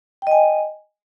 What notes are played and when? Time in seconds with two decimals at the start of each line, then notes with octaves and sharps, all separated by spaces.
0.22 G5
0.27 D#5
0.31 G#5